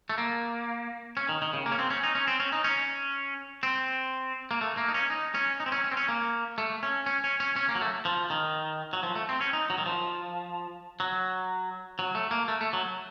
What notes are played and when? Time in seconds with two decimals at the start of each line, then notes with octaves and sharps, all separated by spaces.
0.10 A3
0.18 A#3
1.17 C#4
1.29 D#3
1.42 D#3
1.53 C#3
1.66 A#3
1.72 C#4
1.79 C4
1.90 C#4
2.03 D#4
2.15 C#4
2.27 C4
2.40 C#4
2.52 D#4
2.64 C#4
3.63 C4
4.51 A#3
4.61 A3
4.77 A#3
4.88 D#4
4.94 C#4
5.10 D#4
5.34 C#4
5.60 D#4
5.66 C4
5.72 C#4
5.84 C#4
5.91 C4
5.97 C#4
6.08 A#3
6.58 A3
6.83 C#4
7.06 C#4
7.24 C#4
7.40 C#4
7.56 C#4
7.69 A#3
7.75 F#3
7.81 A3
8.05 F3
8.30 D#3
8.93 F#3
9.03 F3
9.15 A3
9.29 C4
9.41 C#4
9.53 D#4
9.70 F#3
9.78 D#3
9.86 F3
11.00 F#3
11.99 F#3
12.15 A3
12.31 A#3
12.48 A3
12.61 A3
12.73 F#3